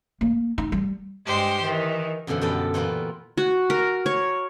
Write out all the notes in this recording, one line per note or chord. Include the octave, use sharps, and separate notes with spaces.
A#3
D#4
G3
G2 G#3 G4 C5 G5
D#3 E3
F#2 B2 D3 E3 F3
F#2 G3 B3 A4 G5
A#2 E3 B3 E4 F4
F#4
A#4
C#5